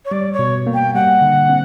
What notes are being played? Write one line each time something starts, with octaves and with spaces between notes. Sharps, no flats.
C#5
G3 D5
C#5
B2
A#3
G5
G3 F#5
D3
C4